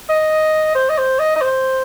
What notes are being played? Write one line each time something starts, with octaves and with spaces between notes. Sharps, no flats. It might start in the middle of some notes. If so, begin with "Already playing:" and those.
D#5
C5
D#5
C5
D#5
D#5
C5